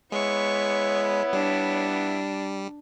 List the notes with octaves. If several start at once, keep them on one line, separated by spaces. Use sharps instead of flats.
G#3 B3 E4 C#5 C#6
G3 D4